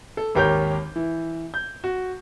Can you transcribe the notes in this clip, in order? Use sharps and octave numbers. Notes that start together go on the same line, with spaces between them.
A4
G#1 D#2 G4 A#4 C#5 G6
E3
G6
F#4